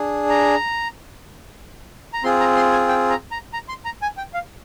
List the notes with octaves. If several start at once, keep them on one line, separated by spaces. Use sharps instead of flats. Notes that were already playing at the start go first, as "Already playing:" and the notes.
Already playing: D4 G#4
A#5
A#5
C4 F4 G#4 C6
A#5
C6
G#5
G5
A#5
A#5
A#5
C6
A#5
G#5
G5
F5